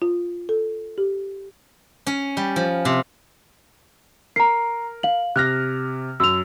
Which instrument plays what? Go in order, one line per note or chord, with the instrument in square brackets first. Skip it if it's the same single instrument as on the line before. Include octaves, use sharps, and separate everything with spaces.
[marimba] F4
A4
G4
[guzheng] C#4
G3
F3
C3
[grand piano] A#4 [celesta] A#5 C7
[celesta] F5 F#7
[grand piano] C3 F6 A#6 [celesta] F#6
[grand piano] F#2 [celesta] E6 F7